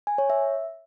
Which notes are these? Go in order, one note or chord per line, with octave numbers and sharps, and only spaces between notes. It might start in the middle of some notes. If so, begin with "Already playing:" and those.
G#5
C#5
E5